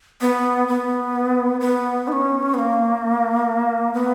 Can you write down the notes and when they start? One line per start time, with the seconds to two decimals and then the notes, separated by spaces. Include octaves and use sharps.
0.21 B3
0.68 B3
1.60 B3
2.08 D#4
2.12 C#4
2.54 B3
2.58 A#3
3.94 B3